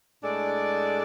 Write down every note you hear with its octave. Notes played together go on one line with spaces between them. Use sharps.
A2 G#3 D4 A4 D5